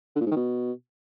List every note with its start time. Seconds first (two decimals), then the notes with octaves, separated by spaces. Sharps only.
0.16 D3
0.21 A#2
0.26 G#2
0.31 D#3
0.36 B2